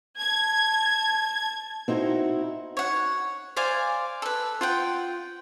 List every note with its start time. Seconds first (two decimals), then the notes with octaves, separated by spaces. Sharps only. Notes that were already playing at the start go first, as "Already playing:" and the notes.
0.19 A5 G#6
1.88 C4 D#4 E4 F#4
2.77 C#5 F#5
3.57 C5 D5 F5 G#5
4.22 A4 B4
4.61 F4 F#5 G5